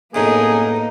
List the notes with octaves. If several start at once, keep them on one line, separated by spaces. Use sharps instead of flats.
A1 F#2 A2 A#3 B3 D#4 G#4